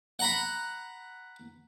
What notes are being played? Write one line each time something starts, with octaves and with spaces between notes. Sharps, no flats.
F#5 A#5 B5